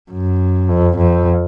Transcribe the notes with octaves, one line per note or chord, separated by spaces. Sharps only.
F#2
F2
F2